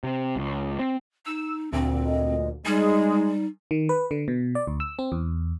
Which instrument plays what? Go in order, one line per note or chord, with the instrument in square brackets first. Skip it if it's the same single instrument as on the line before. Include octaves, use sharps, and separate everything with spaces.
[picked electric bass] C3
C#2
C4
[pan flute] D#4 [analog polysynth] E6
[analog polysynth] D2 A#2 [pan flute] C4
[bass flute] D#5
[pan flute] G3 [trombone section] G#3 [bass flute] D#4 [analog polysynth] G#4
[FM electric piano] D#3
B4
D3
B2
D5
D2
E6
C4
E2